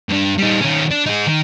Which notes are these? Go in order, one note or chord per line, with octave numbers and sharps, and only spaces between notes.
G2 D4
G3 D#4
D#3 C#4
D4
D#4 G#4
D#3